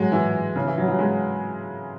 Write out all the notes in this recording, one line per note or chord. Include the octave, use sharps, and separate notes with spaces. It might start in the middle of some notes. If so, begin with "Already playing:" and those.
Already playing: F#3 G#3
E3
C#3
E3
F#3
F#3
G#3